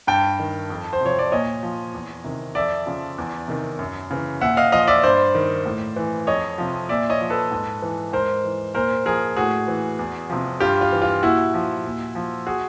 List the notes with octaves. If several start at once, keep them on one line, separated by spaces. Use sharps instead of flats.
G2 G5 A5
D#3
F2
C5
C3 F3 C#5
D5
A#2 C#5 D#5
F3
E2
C3 D#3
F2 D5 E5
C#3 F3
E2
C3 D#3
F#2
C#3 E3
A#2 E5 F#5
D#5 F5
F3 D#5 F5
D5 E5
G2 C5 D5
D#3
A2
E3
F2 C#5 D#5
C3 F3
A#2 D5 E5
C#5 D#5
F3
A4 B4
G#2
E3
G#2 A#4 C5
E3
A#2 A#4 C5
F3 G#4 A#4
A2 F#4 G#4
E3
E2
C3 F3
G2 F4 G4
F4
E3
F4
A#2 E4 F#4
F3
A#2
F3
F#4 G#4